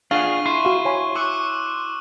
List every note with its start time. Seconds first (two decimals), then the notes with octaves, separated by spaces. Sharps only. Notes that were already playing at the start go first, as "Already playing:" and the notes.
0.11 D4 F4 G#4 F5 F#5 C#6 D#7 G7
0.46 E4 C6
0.65 F#4 F5
0.85 C#5 G#5 B5
1.15 C#6 D6 E6 F#6